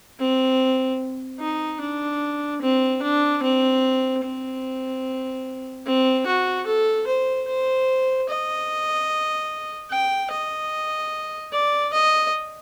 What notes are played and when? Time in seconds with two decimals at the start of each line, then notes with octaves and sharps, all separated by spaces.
0.19 C4
1.40 D#4
1.81 D4
2.62 C4
3.02 D4
3.43 C4
4.24 C4
5.86 C4
6.27 F#4
6.67 A4
7.07 C5
7.48 C5
8.29 D#5
9.91 G5
10.31 D#5
11.52 D5
11.93 D#5